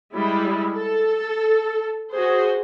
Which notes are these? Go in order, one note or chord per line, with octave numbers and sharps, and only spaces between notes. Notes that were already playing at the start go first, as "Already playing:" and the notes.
G3 G#3 E4
A4
F#4 G#4 C5